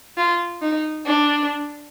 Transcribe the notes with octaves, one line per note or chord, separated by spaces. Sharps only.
F4
D#4
D4